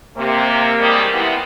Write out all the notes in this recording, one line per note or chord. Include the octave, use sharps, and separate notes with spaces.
C3 A#3
D#3 G3 G#3
C3 E3 B3